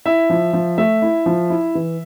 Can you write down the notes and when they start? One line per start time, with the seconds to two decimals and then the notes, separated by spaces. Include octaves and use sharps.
0.06 E4 E5
0.30 F3
0.53 F3
0.78 A3 E5
1.02 E4
1.26 F3
1.50 E4
1.75 E3